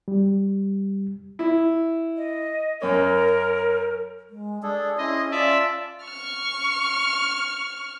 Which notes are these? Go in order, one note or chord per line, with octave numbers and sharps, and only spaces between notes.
G3
E4
D#5
F#2 C#4 A#4
G#3
D4 G#4 A4 D5
C#4 E4 G#4 D#5 C6
F4 D5 E5 A5
C#6 F6